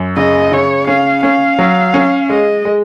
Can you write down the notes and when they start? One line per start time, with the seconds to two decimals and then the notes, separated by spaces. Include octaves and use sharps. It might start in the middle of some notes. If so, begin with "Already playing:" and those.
Already playing: F#2
0.16 C#3 D#5
0.52 C#3 C#5
0.87 C#4 F5
1.23 C#4 F5
1.59 F#3
1.94 C#4
2.30 G#3 D#5
2.65 G#3